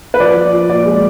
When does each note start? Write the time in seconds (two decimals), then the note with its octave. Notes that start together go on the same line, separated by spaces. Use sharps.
0.14 B4
0.19 F3 D5
0.36 F3
0.53 F3
0.69 A#2 D5
0.86 G#3